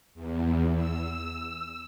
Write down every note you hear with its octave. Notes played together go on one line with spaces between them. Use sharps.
E2
E6